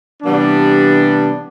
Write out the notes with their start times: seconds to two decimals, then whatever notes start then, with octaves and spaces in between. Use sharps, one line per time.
0.23 C3 E3 G3 B3 D4